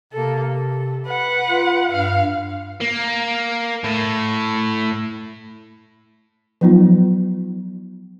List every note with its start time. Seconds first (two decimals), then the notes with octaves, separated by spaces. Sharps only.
0.13 C3 A#3 A4
0.53 A4
1.07 B4 F#5
1.50 F4
1.91 G2 F5
2.81 A#3
3.84 A2
6.61 F3 F#3 B3 D#4 F4